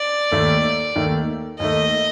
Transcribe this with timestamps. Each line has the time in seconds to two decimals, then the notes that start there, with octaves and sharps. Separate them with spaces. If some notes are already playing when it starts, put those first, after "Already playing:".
Already playing: D5
0.31 D#2 D#3 A3
0.96 D#2 D#3 A3
1.59 D#2 D#3 A3 D#5